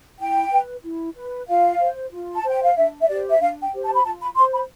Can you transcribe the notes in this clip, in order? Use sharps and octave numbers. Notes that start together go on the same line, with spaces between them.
E4 G5
B4
E4
B4
F4 F5
C5
F4
A5
C5 G5
F5
D4 E5
E5
G4 C5 D5
E5
D4 F5
G5
G4 C5
A5
B5
F4 A5
B5
C5 C6
B5